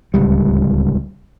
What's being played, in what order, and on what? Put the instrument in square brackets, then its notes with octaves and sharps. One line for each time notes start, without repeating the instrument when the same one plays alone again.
[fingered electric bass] D1 C#2 G3